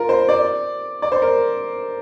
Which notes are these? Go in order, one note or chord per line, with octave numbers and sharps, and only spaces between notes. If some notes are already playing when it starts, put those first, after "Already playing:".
Already playing: F4 A#4
C5
D5
D5
C5
A#4